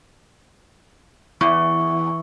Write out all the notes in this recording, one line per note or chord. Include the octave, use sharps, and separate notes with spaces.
E2 E3 C#6